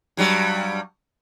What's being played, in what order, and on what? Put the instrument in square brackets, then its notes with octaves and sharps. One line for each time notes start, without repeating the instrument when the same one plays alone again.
[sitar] G2 F#3 G3